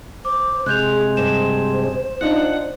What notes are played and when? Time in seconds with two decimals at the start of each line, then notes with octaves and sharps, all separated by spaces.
0.25 C5 D6
0.66 C3 G#3 G#4 F#6 G6 F7
1.17 G2 C5 E7
2.21 D4 D#4 F4 F#5